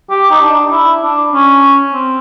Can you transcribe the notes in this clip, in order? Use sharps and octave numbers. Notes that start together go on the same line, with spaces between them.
G4
D#4
D4
E4
D4
C#4
C4